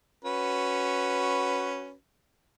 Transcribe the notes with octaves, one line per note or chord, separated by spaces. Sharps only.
C#4 F#4 B4